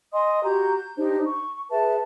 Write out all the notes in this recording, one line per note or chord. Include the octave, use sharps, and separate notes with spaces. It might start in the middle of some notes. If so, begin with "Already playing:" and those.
D#5 G#5 C6 D#6
F#4 G4 A#5 G6
G6
D4 D#4 G4 C5
C#6
G#4 B4 E5 A5